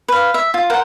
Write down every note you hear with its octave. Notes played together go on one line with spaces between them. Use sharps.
B4 F5
E5
F4
A#4 C5 F#5